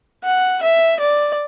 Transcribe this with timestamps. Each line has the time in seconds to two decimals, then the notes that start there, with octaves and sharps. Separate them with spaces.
0.24 F#5
0.63 E5
1.00 D5